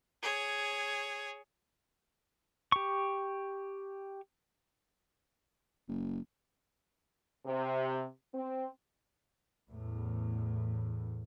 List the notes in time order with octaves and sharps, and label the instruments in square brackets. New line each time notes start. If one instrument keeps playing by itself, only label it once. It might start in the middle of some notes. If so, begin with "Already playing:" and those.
[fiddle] G#4 C#5
[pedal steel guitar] G4 C#6
[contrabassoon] F#1
[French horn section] C3
C4
[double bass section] E2 A2